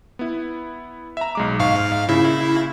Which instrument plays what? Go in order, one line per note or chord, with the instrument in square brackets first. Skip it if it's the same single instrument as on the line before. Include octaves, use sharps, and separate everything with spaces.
[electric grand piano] B3 E4
E5 A#5
B1 G#3 D6
[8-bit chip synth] G#2 F5 [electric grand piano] C#6
[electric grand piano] A#2 C#3 [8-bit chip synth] E4